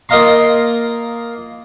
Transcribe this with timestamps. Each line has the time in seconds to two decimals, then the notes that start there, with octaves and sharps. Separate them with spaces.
0.09 A#3 F4 D#5 F5 A#5 C6